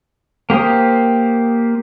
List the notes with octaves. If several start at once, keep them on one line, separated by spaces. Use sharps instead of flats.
A#3 G4 C5 D#6